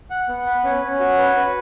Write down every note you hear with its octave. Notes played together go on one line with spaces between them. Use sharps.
F#5
B3
B4
C#4
C#4
F#4
B4
B4